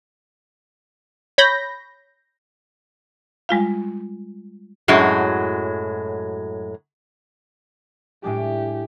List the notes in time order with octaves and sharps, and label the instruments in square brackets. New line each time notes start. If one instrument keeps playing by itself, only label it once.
[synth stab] C#5 B5 G6 A#6
[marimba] G3 G#3 F4 F5
[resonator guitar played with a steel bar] F#2 A2 F#3 G#3
[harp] A2 G#3 D4 [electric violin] G4